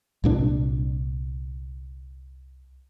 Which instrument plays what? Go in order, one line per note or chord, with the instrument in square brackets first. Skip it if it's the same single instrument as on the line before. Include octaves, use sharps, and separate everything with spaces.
[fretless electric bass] C2 A#2 D4